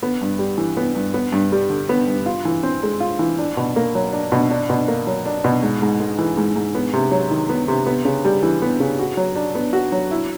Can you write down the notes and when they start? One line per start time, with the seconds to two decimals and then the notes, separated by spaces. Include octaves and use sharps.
0.03 B3
0.21 G2
0.39 G3
0.58 E3
0.77 B3
0.95 G2
1.14 B3
1.32 G2
1.52 G3
1.70 D3
1.89 B3
2.08 G2
2.26 F4
2.45 E3
2.63 C4
2.83 G#3
3.00 F4
3.19 E3
3.38 D4
3.57 B2
3.76 A#3
3.95 F#3
4.13 D4
4.32 B2
4.51 D4
4.70 B2
4.88 A#3
5.07 F#3
5.26 D4
5.44 B2
5.63 G#2
5.82 G#2
6.00 G#3
6.18 E3
6.37 G#2
6.56 G#2
6.75 B3
6.93 C3
7.11 F#3
7.31 D#3
7.49 B3
7.68 C3
7.86 B3
8.05 C#3
8.25 G3
8.43 E3
8.62 B3
8.80 C#3
8.99 F#4
9.17 F#3
9.36 D4
9.55 B3
9.73 F#4
9.92 F#3
10.11 E4